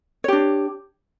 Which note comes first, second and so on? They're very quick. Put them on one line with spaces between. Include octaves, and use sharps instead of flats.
C#5 G4 D4